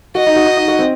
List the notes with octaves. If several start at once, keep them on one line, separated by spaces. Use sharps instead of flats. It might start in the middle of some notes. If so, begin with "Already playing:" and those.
F#4 D#5
D#4
F#4
D#4
D#4
F#4
C4